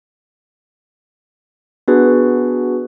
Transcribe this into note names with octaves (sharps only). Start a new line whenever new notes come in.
B3 D4 F#4 G#4 B4